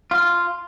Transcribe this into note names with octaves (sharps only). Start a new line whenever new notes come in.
F4